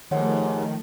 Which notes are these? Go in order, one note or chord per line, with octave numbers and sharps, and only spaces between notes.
D#2 G#2 D#3 F3 A3 C#5 F#5